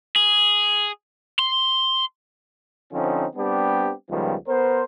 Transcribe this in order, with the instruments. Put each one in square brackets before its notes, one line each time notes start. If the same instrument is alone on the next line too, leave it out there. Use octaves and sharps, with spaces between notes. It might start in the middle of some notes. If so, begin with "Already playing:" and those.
[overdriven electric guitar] G#4
C6
[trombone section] D3 F3 C4 C#4 D#4
G3 B3 C4 D4 G4
C#2 D#3 F3 G3 B3
B3 A#4 C5